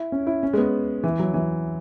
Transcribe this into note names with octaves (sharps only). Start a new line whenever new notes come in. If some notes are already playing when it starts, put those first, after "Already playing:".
Already playing: E4
C#4
E4
C#4
G#3
B3
E3
F#3
E3